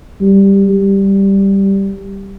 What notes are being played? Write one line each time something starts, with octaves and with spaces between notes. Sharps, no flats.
G3
G3